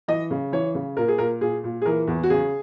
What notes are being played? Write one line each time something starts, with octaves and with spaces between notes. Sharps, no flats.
E3 D#5
C#3
E3 C#5
C#3
A#2 A#4
G#4
A#2 A#4
A#2 G#4
A#2
G#4
E3 A#4
E2
F#4
C#3 G#4